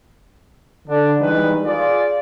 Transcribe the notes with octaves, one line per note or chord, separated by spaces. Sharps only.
D3 D4
D#3 E3 G3 G#3 D#4 B4
F4 G#4 D5